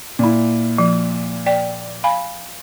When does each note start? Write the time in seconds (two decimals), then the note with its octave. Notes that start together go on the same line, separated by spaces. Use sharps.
0.19 A#2 E4
0.78 F3
1.46 D5 G5
2.04 F5 G#5 B5